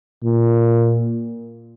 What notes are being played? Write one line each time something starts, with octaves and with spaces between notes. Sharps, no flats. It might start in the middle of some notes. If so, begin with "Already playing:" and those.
A#2